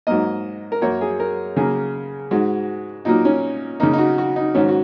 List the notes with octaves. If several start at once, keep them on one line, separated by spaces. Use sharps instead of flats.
G#2 F#3 A#3 D#5
A#4
F#2 F#3 A#3 C#5
G#4
A#4
C#3 F#3 A#3 G#4
G#2 G#3 F#4
A#2 F#3 A#3 D#4
C#4
C#3 A#3 D#4
D#4
F#4
F#4
D#4
G#2 D#3 F#3 C#4
F#4